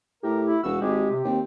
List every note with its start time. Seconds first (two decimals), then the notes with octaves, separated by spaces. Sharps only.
0.23 A2 G4 A#4
0.46 E4
0.63 E1 F#4 E6
0.81 G#1 G#3 G4
1.11 C3
1.24 D#2 C4